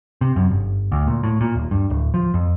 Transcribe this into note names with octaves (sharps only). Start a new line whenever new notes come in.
C3
F#2
G1
D2
A#2
A2
A#2
D#1
G2
D1
F3
F2